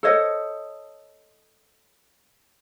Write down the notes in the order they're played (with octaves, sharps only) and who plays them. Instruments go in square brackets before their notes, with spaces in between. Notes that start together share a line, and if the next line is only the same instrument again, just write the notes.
[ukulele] A4 C5 C#5 D#5